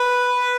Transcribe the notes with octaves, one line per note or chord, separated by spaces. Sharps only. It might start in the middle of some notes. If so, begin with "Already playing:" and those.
Already playing: B4